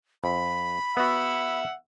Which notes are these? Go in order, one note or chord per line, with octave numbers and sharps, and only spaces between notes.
F2 B5
B3 F#4 E5 F#5 E6